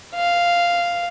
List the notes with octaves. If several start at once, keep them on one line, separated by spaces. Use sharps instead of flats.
F5